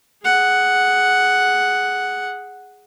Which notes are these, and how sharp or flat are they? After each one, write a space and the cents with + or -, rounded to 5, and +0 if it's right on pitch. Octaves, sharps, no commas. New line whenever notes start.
G#4 +0 F#5 +0